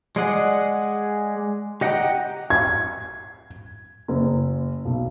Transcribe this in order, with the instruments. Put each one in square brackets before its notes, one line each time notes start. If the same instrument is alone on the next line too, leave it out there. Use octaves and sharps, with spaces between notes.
[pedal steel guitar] G#3 G#4 D5 D#5 F#5
G4 D#5 F#5 G5 A#5
[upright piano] G#6
[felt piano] F#1
B1